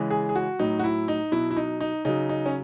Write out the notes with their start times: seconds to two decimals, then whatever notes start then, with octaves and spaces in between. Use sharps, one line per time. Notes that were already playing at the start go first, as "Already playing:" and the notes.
Already playing: C#3 E3 G#3
0.10 G#4
0.29 G#4
0.35 F#4
0.59 A2 F#3 D#4
0.79 F#4
0.84 E4
1.08 D#4
1.32 B2 F#3 E4
1.51 E4
1.57 D#4
1.80 D#4
2.05 C#3 F#3 D#4
2.29 D#4
2.46 C#4